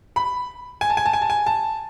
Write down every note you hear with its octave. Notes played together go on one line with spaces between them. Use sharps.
B5
G#5
A5
G#5
A5
G#5
A5
G#5
A5